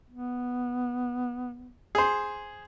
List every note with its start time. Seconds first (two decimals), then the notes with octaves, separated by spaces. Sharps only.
0.10 B3
1.95 G#4 C5